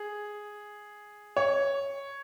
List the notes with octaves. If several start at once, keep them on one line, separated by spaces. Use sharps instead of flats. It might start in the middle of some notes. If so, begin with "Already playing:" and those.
Already playing: G#4
C#5